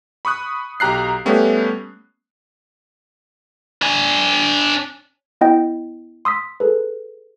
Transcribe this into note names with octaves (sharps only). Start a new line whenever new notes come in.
B5 C#6 D#6 F#6
B1 G4 A#5 F#6 C7
G3 A3 B3 C#4 G4
D4 G#5
B3 E4 D#5 G5
C6 D#6 E6 B6
G#4 A4 B4